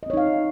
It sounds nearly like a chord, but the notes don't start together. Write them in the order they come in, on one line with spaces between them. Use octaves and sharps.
D#5 C4 C#5 D#4 F5